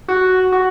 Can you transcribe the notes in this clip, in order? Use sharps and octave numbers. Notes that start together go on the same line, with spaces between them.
F#4
F#4